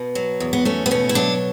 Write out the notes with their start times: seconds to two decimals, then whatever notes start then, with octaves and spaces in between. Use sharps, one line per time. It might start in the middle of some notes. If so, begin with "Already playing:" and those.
Already playing: B2
0.15 F#3
0.40 E2
0.53 B3
0.65 A3 C#4
0.86 B3
0.91 B2 C#4
1.09 E4
1.15 F#3 D4